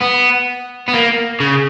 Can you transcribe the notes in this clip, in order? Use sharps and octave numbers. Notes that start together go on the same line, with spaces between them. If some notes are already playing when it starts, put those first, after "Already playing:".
B3
B3
A#3
C#3